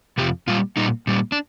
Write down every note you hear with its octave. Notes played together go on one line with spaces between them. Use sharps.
F2 C3 F3 G4
A#2 G3 F4
A#2 G3 D#4
A#2 G3
D4